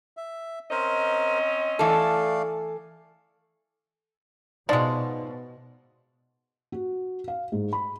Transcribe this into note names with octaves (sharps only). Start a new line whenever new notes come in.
E5
C4 C#4 A#4 C5 D#5
E3 A3 A4 D5 F5
B2 F3 G#3 D#4 D5
F#4
F5
G#2
B5